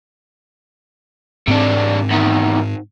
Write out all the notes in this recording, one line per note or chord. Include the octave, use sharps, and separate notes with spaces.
G#2 C3 C4 D4
E2 D#3